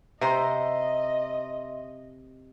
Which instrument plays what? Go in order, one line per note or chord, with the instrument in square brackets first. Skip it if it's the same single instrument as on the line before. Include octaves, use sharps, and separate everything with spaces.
[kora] C3 [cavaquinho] C5 A#5 [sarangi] D#5 [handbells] E5 C6